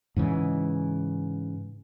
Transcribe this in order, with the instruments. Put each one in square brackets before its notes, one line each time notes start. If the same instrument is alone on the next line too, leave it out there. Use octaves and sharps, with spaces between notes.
[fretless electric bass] G#2 C#3 E3